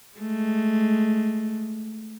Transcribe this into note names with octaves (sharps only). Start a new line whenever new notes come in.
G#3 A3